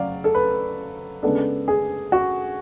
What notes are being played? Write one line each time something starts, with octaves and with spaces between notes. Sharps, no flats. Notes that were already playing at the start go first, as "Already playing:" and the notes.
Already playing: C#3 F#3 D5 F5
A4
B4
C#3 G#3 B3 D4 A4
G#4
F#4